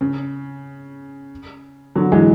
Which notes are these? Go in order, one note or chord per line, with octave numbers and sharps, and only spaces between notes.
C#3
D3 F#3
E3 G#3